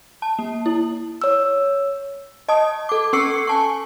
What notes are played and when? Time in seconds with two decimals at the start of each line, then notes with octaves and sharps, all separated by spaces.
0.22 A5
0.39 A#3
0.66 E4
1.22 C#5 E6
2.48 D#5 A5 D#6
2.89 A4 D6
3.13 C#4 A4 C#6 E6 C7 C#7
3.47 G#5 A5 C#6